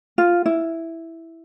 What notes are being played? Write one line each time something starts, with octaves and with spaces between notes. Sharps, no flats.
F4
E4